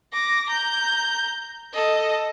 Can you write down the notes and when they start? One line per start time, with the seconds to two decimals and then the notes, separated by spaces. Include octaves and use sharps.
0.13 D6 A#6
0.49 A#5 G6
1.73 A4 D#5